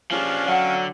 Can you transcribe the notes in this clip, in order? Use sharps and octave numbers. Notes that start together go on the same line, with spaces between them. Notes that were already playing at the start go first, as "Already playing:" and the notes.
F3 C#4 D4 G4 G#4 C5 F5
D3 F#3 F#5 G5